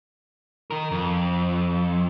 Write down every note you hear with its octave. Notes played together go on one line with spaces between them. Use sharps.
D#3 A#4
F2